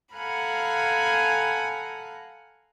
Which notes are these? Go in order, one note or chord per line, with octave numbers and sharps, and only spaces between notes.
A4 F5 F#5 G#5 A#5 B5